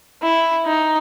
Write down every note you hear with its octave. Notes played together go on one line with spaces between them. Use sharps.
E4
D#4